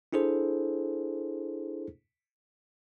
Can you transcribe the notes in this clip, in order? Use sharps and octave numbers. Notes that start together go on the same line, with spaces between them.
D4 E4 G#4 A4 C5